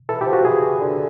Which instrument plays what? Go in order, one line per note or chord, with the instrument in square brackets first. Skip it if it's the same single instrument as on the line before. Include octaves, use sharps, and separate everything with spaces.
[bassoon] E3 [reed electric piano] A4
[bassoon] E3 [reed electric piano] G4
[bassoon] F3
[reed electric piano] F#4
[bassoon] E3 [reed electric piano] G#4
[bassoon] D3